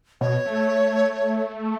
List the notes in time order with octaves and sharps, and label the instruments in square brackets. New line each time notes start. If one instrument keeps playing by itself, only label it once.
[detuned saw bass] B2 [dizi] C#5
[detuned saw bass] A3